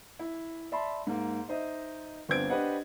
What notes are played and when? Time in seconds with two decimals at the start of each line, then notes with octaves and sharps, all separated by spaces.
0.19 E4
0.72 D5 E5 A5 B5 C6
1.07 G#2 A#3
1.48 D#4 C5 D#5 E5
2.29 G1 B3 C4 D4 G#6 D7
2.50 D4 G4 B4 C5 D#5 F#5